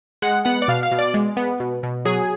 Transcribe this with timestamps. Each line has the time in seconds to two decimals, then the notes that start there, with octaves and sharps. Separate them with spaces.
0.22 G#3 F#5
0.45 B3 F#5
0.62 D5
0.68 B2 F5
0.83 F5
0.92 B2
0.99 D5
1.14 G#3
1.37 B3
1.60 B2
1.83 B2
2.05 F#3 G#4